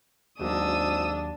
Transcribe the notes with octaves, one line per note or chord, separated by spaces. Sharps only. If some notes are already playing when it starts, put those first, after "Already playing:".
G#1 D#2 F#3 A#3 D4 D#6 E6